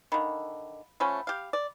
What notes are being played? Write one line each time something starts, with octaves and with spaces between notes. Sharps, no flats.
D3 D#3 F5 B5
F3 A3 C#4 F#5 B5
G4 F5
D5